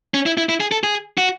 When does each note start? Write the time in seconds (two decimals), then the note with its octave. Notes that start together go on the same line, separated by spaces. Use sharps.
0.14 C#4
0.26 E4
0.37 E4
0.49 E4
0.60 G#4
0.72 A4
0.84 G#4
1.18 F#4